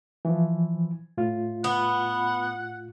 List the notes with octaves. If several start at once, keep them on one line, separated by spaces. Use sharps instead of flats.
E3 F3
A2 F4
B3 F#5